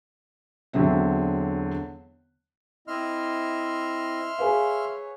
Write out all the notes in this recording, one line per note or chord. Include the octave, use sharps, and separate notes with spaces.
E1 D3 F#3 C4 E5
C4 E4 D#5 E5 C6 F6
G#4 B4 C#5 F5